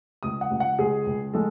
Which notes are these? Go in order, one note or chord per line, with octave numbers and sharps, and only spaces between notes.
C#2 D#6
F#5
C#2
F#5
C#2 G#4
C#2
G#3 A4